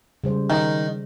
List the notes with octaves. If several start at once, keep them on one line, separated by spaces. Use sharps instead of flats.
C#3 G3 C5
D#3